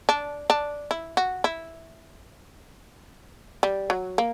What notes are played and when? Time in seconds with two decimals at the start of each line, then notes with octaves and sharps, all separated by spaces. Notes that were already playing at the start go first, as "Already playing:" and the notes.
0.09 D4
0.50 D4
0.91 E4
1.17 F#4
1.44 E4
3.63 G3
3.90 F#3
4.18 A#3